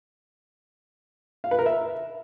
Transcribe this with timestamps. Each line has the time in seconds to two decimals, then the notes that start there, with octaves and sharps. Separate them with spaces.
1.44 F5
1.51 B4
1.59 A#4
1.66 E5